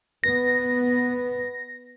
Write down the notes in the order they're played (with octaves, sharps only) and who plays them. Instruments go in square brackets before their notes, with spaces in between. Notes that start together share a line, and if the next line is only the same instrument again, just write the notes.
[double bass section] B3 [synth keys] A#6